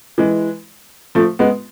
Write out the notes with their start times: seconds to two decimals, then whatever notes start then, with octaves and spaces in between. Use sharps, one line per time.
0.18 E3 G#3
1.15 F3 A3
1.39 G#3 B3